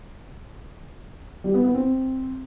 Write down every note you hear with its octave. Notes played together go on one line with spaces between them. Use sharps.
G3
B3
B3
C4